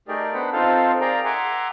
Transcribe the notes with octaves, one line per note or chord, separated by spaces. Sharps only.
A3 D#4 G4 G#4 A#4 D5
B3 D4 C5 F#5 B5
C4 D#4 F4 A4 C5 F5
G#4 A#4 D5 F5 G5 A#5
E5 F#5 G#5 A#5 C6 D6